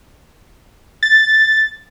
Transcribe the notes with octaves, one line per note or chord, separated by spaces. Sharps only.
A6